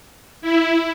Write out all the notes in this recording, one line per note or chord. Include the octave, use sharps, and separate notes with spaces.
E4